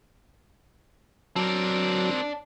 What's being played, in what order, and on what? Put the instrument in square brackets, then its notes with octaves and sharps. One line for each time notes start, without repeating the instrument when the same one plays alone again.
[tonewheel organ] F#3 [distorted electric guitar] C4 A#4 [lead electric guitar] D5 A5